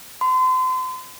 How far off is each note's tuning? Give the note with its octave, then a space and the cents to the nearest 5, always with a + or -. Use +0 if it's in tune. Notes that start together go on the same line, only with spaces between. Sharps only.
C6 -35